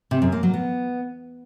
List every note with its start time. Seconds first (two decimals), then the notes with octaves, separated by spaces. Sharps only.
0.11 C3
0.22 F#2
0.32 A#3
0.43 F#3
0.54 B3